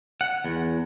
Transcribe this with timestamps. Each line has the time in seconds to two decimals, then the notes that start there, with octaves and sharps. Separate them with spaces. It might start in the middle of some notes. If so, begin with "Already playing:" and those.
0.21 F#5
0.44 E2